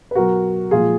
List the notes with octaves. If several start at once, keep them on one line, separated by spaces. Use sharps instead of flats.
B4
B2 F#3 F#4 A#4
A#2 F3 G#3 F4 G#4